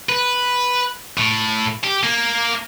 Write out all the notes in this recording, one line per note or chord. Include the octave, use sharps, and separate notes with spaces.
B4
A2
G4
A#3